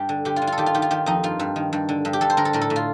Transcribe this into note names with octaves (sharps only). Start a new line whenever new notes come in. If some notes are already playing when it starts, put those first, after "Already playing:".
Already playing: G2 G4
D3
D3 G4
F4
D3
F4 A4
D#3 G4
F4
D#3 G4
F4
D#3 G4
F2 D#4
G2 F4
G2
D#3
G2
D3
G2
G4
G2 A4
C5
D3 A#4
A4
A2 A#4
A4
A2
F4